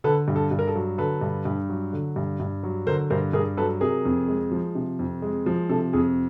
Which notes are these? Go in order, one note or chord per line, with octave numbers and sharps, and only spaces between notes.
D3 A4 B4
G2
A4
G2
A#4
A4
F#3
D3 A4 B4
G2
G2
F#3
D3
G2
G2
F#3
D3 A#4 C5
G2 A#4 C5
G2 G#4 A#4
F#3 A4 B4
C3 G#4 A#4
F2
G#3
F3
C3
F2
G#3
F3
C3 A4
F2 G#4